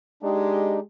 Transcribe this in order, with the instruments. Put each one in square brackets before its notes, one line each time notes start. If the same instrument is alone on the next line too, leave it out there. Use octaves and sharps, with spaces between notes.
[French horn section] G#3 G4 [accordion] D4 D#4